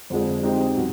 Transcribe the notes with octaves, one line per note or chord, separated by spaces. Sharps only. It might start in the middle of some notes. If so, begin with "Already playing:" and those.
F2 D3 F3 G#3
G#3 C4 D#4 G4 C5
B2 F#3